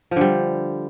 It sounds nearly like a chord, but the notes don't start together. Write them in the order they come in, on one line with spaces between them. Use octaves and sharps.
F3 D3 G3